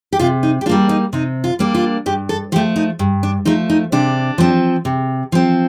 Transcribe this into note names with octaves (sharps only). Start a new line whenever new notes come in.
G4
C3 F4
D#4
G4
G3 A#3 D4 F4
D#4
C3 D#4
F4
G3 A#3 D4
F4
G2 G4
A4
F3 A3 G4
D#4
G2
D4
F3 A3 D#4
D#4
C3 D4
F3 C4
C3
F3 C4